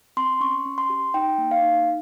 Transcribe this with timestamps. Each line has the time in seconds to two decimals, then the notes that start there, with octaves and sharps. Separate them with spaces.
0.17 C4 C6
0.40 C#4 C#6
0.65 C#4
0.78 C6
0.90 G4
1.14 D#4 G5
1.38 A#3
1.51 F5
1.62 D#4